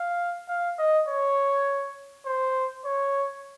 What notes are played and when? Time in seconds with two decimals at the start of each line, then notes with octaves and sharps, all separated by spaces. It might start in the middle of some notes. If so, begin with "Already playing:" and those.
Already playing: F5
0.48 F5
0.79 D#5
1.08 C#5
2.26 C5
2.85 C#5